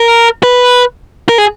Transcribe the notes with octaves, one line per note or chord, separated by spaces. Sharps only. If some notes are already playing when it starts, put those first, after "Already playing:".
Already playing: A#4
B4
A#4
G#4